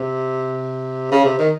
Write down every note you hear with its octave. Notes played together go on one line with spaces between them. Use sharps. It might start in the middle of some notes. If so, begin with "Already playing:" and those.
Already playing: C3
C#3
C3
D#3